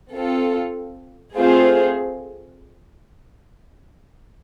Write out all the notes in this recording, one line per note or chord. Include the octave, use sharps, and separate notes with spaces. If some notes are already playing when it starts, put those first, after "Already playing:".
C4 F4 A4
A3 C4 F4 G#4 C5